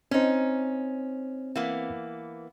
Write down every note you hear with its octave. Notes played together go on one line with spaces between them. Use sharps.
C4 C#4 D#4 C5
E3 A#3 B3